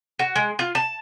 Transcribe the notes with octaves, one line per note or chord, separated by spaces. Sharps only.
F#4
G#3
F4
A5